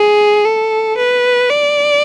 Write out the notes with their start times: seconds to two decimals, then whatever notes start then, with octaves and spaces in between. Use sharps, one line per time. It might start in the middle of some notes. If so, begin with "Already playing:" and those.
Already playing: G#4
0.45 A4
0.97 B4
1.50 D5